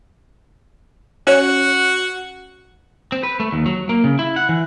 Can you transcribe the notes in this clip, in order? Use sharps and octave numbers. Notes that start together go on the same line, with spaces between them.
C#4 F#4 C#5
C4
B4
A3
D#2
F#3
A#3
C#3
E4
F#5
E3